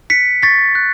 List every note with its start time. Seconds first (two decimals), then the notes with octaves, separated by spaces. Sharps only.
0.10 F#6 B6 C#7
0.42 C#6 A6 B6
0.75 F#6